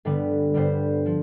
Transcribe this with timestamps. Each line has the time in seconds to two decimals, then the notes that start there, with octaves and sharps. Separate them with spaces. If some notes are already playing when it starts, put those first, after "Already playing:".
0.05 G2 D3 G3 B3
0.54 G2 D3 G3 B3 C5
1.06 F3